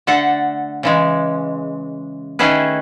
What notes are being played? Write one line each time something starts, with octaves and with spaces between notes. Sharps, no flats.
D3 A3 A4 F#5
C#3 E3 G#3
D#3 A3 C#4 E4 G#4 B4